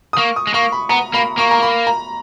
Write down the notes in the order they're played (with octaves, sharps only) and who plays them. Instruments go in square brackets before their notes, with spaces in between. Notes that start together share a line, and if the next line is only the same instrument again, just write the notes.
[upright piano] D#6
[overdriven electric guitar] A#3 [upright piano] C#6
[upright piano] D#6
[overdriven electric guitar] G#3
[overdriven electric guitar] A#3 [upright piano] C#6
[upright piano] B5
[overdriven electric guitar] B3 [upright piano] A#5
[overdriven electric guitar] A#3 [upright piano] B5
[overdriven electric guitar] A#3 [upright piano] C#6
[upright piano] A#5
B5
A#5